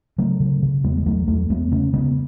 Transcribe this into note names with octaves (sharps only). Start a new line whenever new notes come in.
C#3 F#3 A3
C#3
C#3
E2 G#3 B3
G#3
E2 F#3 A3
E2 F#3 A3
E2 G#3 B3
C#3 A3 C#4
C#3 G#3 B3